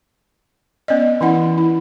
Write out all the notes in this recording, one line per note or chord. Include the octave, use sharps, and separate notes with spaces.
B3 C#4 D5 D#5
E3 C#4 E4 F#5
E4